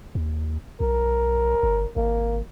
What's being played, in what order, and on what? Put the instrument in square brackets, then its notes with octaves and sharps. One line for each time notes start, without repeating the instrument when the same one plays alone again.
[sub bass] D#2
[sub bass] B1 [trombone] A#4
[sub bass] G1
[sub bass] G#1 [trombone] A#3